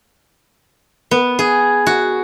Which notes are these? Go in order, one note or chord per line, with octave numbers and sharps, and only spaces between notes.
B3
G#4
F#4